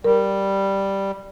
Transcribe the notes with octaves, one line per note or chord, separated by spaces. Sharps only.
G3 A#4